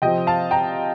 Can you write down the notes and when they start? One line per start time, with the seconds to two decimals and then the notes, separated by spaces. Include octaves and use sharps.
0.02 C3 F3 C4 D#5 G5
0.27 F5 A5
0.51 G5 A#5